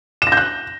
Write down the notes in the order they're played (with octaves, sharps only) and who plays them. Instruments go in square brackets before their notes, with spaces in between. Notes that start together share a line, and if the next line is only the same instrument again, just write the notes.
[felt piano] E7
A#6
G6
F#6